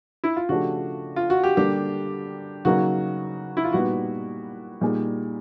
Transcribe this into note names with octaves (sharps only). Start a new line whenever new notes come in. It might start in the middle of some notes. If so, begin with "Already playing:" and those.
E4
F4
C#3 F3 A3 D4 F#4 G4
F4
F#4
G4
D3 G3 A#3 D4 G4
C#3 F#3 A#3 D#4 F#4
E4
F4
A#2 G3 B3 D#4 F#4
A#2 G3 A#3 D#4 G#4